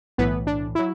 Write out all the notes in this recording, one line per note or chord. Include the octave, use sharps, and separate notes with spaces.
B1 A2 E3 B3 B4
D4
F#3 E4